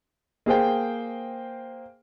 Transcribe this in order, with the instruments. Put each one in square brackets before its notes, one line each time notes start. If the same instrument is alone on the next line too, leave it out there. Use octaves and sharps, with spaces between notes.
[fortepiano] A#3 G#4 C5 G5